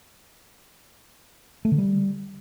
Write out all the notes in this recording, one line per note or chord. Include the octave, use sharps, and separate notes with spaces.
A3
D3
G3